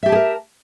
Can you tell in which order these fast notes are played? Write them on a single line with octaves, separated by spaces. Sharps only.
E5 G4 A5 G#4 A#4